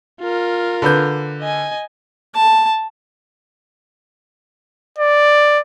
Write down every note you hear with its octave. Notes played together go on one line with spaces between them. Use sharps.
F4 A#4
D3 B4 G6
D#5 G#5
A5
D5